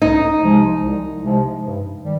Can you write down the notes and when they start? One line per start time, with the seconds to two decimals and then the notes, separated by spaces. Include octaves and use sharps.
0.02 C2 D#4
0.42 C3 F3 G#3
0.83 C2
1.23 C3 F3 G#3
1.64 G2
2.04 D#3 G3